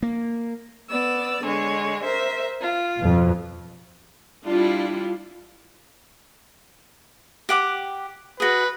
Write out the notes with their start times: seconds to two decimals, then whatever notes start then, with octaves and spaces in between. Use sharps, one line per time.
0.03 A#3
0.88 B3 D5 E6
1.44 D3 G#3 C#5
2.04 A#4 C5 E5
2.62 F4
2.99 F2 B2
4.47 G3 D4 E4 F4
7.49 G4 F#5 D6
8.40 F#4 G#4 B4